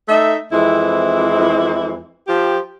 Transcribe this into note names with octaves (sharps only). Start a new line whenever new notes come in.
A3 D#4 E5
F2 E3 G#3 C4 E4
F3 G4